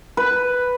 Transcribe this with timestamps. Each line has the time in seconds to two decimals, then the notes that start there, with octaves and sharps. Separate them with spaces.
0.17 B4